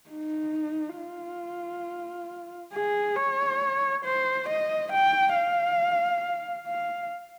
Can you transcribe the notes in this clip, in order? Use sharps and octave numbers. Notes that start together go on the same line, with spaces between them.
D#4
F4
G#4
C#5
C5
D#5
G5
F5
F5